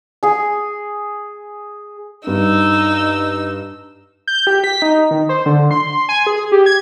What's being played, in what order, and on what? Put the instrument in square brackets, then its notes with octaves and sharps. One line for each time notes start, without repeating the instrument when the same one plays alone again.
[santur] G#4 G#5
[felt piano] G2 [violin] D#4 E6
[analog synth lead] G6
G4
B6
D#4
D#3
C5
D3
C6
G#5
G#4
G4
G#6